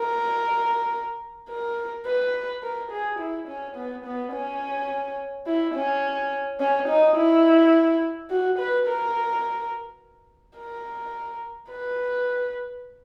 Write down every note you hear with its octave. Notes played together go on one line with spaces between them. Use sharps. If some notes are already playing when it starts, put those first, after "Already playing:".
Already playing: A#4
A#4
B4
A#4
G#4
E4
C#4
B3
B3
C#4
E4
C#4
C#4
D#4
E4
F#4
B4
A#4
A#4
B4